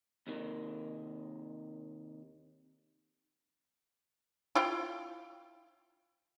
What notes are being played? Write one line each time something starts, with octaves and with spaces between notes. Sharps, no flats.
D#2 C3 D#3
E4 F4 G5